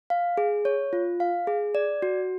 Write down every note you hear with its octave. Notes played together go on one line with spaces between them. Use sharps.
F5
G#4
C#5
F4
F5
G#4
D5
F#4